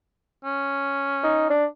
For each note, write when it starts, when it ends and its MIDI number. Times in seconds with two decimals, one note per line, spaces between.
0.44 1.57 61
1.24 1.46 63
1.50 1.65 62